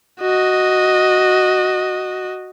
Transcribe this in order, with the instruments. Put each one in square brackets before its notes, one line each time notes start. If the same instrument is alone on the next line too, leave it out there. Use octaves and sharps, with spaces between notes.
[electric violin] F#4 D#5